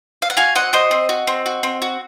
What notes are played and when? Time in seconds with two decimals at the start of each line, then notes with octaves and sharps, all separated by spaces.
0.22 F5
0.30 F#5
0.37 F#4 F5 G#5
0.55 C4 D#5 F#5
0.73 F#4 C5 D#5
0.91 C4
1.09 F#4
1.27 C4
1.46 F#4
1.63 C4
1.82 F#4